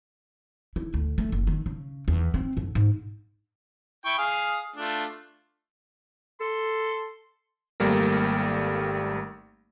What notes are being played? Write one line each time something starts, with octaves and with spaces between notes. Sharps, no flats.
E4
D2
A3
F#1
D#3
C#3
E2
C4
F#2
G#2
E4 G5 C#6
G#4 F5 D#6
A3 D4 F4
A4 C6
G#1 G3 A3 A#3 A#4